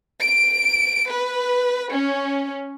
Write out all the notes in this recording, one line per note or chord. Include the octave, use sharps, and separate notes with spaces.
D7
B4
C#4